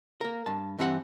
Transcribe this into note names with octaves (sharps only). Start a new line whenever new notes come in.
A#3 A#4
G2 A5
G2 E3 C4 G4 A4 F#5